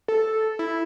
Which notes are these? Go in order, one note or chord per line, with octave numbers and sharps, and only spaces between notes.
A4
E4